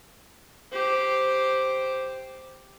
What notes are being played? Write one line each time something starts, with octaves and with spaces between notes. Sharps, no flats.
G4 C5